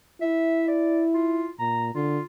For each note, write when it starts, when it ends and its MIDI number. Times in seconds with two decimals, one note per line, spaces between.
0.21 1.49 64
0.21 0.65 76
0.68 1.03 74
1.14 1.50 65
1.59 1.90 46
1.59 1.89 82
1.95 2.19 50
1.95 2.23 65